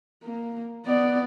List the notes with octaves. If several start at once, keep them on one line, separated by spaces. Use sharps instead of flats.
A#3
B3 D5